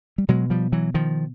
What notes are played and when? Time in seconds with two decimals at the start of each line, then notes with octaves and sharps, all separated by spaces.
0.18 G3
0.28 B2 F#3 G#3
0.50 F3 G3
0.72 E3 F#3
0.94 D#3 F3